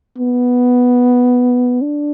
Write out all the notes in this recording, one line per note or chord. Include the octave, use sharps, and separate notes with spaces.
B3
D4